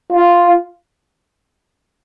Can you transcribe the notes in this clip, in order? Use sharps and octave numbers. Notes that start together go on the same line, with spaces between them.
F4